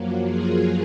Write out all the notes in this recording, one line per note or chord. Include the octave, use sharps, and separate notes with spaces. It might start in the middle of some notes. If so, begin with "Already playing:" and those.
Already playing: F#2 F3 F#3 A#3
F4 G#4